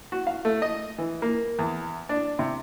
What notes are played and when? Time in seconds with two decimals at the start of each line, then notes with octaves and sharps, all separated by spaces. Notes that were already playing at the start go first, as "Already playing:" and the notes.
0.12 F#4
0.27 F5
0.45 A3
0.62 D#5
0.98 E3
1.22 A#3
1.59 E2
2.09 D4
2.39 C3